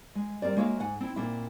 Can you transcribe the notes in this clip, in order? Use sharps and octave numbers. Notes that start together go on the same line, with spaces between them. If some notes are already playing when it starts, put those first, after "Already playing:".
G#3
G3 C4 A#4 D5
G#3 A#3 F#4 C#5 E5 F5
G#2 F#5 G#5
C4 E4
A#2 C4 D4 E4